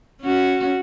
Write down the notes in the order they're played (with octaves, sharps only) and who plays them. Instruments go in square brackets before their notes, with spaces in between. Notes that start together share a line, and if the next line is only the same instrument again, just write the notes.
[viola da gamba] C#4 F#4